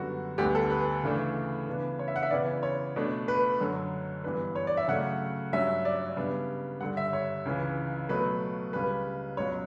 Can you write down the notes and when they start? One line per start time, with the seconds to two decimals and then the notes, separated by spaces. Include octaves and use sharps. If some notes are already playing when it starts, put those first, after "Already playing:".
Already playing: F#2 D3 G3 B3 F#4
0.38 D2 D3 G3 B3 G4
0.55 A4
0.70 B4
1.03 C#3 E3 A3 D4
1.67 C#3 E3 B3 D4
1.99 C#5
2.08 E5
2.16 F#5
2.23 E5
2.31 C#3 E3 B3 D5
2.63 C#5
2.96 B2 A3 D4
3.28 B4
3.60 F#2 D3 F#3 C#4
4.24 G2 E3 B3 D4 B4
4.55 C#5
4.67 D5
4.77 E5
4.88 C#3 F#3 A3 F#5
5.53 G2 F#3 C#4 E5
5.85 D5
6.17 C#3 G3 B3 D4
6.80 G2 D3 G3 F#5
6.97 E5
7.13 C#5
7.45 C#2 C#3 E3
8.09 B2 F#3 A3 B4
8.73 C#2 C#3 G3 B4
9.37 C#2 B2 F#3 C#5